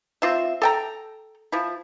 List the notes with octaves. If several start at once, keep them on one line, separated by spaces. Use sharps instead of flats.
C4 F4 E5
A4 G5 A#5
F3 E4